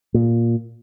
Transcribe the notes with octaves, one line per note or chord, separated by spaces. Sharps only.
A#2